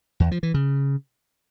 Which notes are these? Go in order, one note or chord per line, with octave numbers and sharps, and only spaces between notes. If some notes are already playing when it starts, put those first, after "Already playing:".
E2
F3
E3
C#3